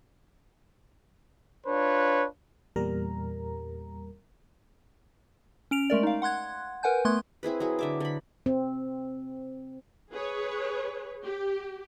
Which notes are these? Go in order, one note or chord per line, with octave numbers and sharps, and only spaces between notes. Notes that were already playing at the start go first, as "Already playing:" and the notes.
D4 F4 B4 C#5
E2 A#2 G3 A#4 A#5
C#4 D7 F7
G#3 A3 A#4 D5
D#4 F5
F#5 C6 F#6 G#6
A#4 B4 F#5 G#5 G6
A3 B3 C6 F#6 G#6
C4 E4 G#4 B4
F#3 E4 G#4
D3 E5 D6
D3 B5
C4
G#4 B4 C#5
G4